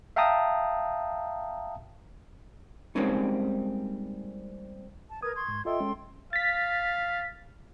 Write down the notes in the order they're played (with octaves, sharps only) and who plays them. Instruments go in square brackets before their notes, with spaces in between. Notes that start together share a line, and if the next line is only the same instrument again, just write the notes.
[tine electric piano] E5 F5 G5 A5 A#5 D#6
[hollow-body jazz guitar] G3 G#3 A#3 C4 C#4 D#4
[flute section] A5
[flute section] A#4 B4 G#6 [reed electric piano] D#6
[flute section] C6 C#6 G#6
[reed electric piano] G#2
[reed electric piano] F4 D#5 E5 [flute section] A4 G5 C6
[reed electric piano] G#3 C#4
[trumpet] F5 [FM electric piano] A6 B6